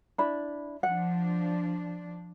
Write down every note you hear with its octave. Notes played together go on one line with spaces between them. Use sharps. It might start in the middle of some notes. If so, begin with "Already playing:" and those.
D4 E4 B5
F3 D4 F#5